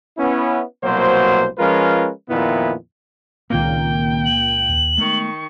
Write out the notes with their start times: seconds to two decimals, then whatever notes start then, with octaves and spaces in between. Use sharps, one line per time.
0.18 B3 C#4 E4
0.83 C2 B2 F#3 A#3 C5
1.58 F3 G#3 C#4 F4 A#4 B4
2.29 F2 A#2 D#3 B3 E4
3.50 C#2 A#2 D#3 A#3 C4 G5
4.25 F#7
4.69 D#2
4.98 D#3 G#3 A3 B3 C#6